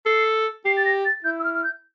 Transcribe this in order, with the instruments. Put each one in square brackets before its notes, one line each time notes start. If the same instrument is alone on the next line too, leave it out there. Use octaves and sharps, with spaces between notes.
[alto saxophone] A4 [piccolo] C7
[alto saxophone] G4 [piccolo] C7
[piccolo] A6
A#6
A6
[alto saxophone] E4 [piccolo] G6
[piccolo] E6
F6
F6
G6